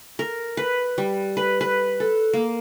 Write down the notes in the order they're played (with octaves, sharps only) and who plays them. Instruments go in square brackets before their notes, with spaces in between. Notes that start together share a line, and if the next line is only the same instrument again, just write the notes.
[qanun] A#4
B4
G3
B4
B4
A4
A#3